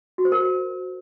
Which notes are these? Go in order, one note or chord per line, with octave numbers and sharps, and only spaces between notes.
F#4
C5
A#4